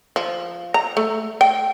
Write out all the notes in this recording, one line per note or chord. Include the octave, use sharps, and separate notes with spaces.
F3
A#5
A3
G5